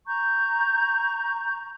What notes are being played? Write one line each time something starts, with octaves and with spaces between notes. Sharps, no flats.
A#5 C#6 G6